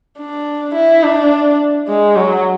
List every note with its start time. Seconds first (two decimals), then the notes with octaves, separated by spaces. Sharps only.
0.19 D4
0.75 E4
1.03 D4
1.88 G#3
2.16 F#3